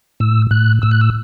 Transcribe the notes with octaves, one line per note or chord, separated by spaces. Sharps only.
A2 E6
A2 F#6
A2 E6
F#6
E6